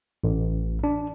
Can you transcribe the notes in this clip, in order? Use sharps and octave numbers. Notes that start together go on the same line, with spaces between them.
A1
D4